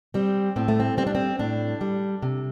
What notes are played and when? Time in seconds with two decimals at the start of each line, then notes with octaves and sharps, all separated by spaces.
0.14 G3 C4
0.56 A2 C4
0.68 A3
0.80 C4
0.97 G3 C4
1.07 D4
1.15 C4
1.39 A2 D4
1.81 G3
2.22 C3